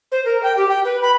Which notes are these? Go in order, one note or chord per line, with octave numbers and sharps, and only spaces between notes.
C5
A#4
G5
G4
G5
B4
B5